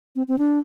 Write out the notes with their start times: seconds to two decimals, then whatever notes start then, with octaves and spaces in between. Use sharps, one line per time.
0.16 C4
0.28 C4
0.38 D4